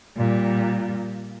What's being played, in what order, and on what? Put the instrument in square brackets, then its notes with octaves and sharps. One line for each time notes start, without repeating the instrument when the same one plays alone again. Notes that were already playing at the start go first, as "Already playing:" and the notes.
[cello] A#2 G3